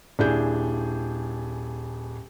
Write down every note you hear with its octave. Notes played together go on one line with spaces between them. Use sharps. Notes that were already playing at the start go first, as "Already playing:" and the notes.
D#1 D4 E4 G#4 G6